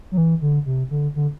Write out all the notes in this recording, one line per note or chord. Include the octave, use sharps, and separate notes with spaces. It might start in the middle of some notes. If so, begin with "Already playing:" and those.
F#3
E3
D3
C3
D3
D3